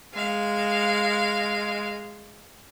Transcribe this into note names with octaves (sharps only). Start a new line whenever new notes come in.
G#3 F5